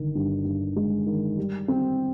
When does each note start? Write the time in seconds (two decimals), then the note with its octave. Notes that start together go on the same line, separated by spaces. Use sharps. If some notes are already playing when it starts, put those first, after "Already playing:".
Already playing: G1 D#3
0.15 G2
0.45 G2
0.76 G#3
1.06 D#3
1.37 G3
1.68 C4